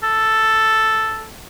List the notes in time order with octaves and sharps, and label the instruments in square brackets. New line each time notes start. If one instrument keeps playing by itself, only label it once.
[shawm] A4